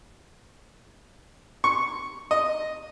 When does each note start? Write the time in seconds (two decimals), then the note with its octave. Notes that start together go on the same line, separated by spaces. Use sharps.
1.64 C#6
2.31 D#5